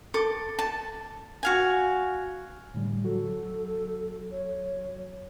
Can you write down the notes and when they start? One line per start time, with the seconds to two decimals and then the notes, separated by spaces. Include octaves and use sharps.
0.14 A4 D6
0.59 A5
1.43 F#4 F5 G#5
2.74 A2 D3 G3
3.05 F#3 F#4 A4
4.31 C#5